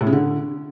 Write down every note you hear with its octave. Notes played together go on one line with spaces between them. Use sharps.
A2
C#3
D3